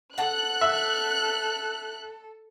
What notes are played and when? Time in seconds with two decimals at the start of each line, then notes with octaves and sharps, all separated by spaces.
0.18 A4 F#5 A5 F#6
0.61 E5